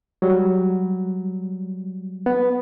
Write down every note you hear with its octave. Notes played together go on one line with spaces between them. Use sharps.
F#3 G3
B3